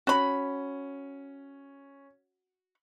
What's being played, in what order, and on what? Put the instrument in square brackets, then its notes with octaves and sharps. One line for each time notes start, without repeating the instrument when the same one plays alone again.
[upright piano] C#4 [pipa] F#4 B5